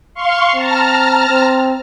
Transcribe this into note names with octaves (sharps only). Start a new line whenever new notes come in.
F5 C6 C#6
C4 A5 A#5 F6
C4